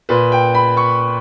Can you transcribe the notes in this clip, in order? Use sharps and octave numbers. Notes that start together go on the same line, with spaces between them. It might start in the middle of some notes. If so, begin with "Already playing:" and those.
A#2 B4
G5
B5
C#6